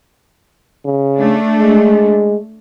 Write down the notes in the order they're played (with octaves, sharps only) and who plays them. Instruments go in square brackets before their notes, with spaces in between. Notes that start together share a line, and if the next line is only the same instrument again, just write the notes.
[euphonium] C#3
[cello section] A3 D4
[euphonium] G#3